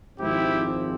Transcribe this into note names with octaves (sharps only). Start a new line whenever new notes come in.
G#1 G#2 F3 C4 E4 G4